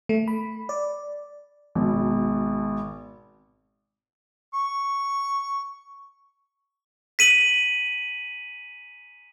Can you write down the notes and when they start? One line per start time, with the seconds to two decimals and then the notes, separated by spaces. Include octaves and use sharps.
0.09 A3
0.28 B5
0.69 D5
1.75 G#1 B2
4.54 C#6
7.19 B6 D#7 F#7